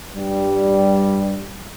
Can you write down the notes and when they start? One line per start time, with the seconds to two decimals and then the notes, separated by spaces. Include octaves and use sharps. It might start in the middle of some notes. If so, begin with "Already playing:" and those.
0.16 G2 G3